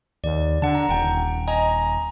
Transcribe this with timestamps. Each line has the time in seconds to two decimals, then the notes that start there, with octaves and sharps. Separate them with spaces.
0.24 D#2 D5
0.62 D3 F#5 A5
0.75 A#5
0.89 D#1 F#5 G5
1.48 D#5 G#5 A#5